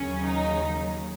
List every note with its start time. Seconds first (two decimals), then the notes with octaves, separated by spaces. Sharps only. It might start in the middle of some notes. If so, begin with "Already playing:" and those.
Already playing: D#2 C#3 F#3 C#4
0.25 D#4